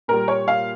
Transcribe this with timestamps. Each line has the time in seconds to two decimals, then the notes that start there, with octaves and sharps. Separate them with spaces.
0.08 A#2 G3 A#4
0.28 C#5
0.48 F5